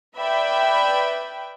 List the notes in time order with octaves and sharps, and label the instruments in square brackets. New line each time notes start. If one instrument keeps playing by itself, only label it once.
[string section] B4 D5 E5 G5 B5